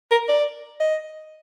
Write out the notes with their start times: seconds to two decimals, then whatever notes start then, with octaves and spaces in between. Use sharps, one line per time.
0.11 A#4
0.29 D5
0.80 D#5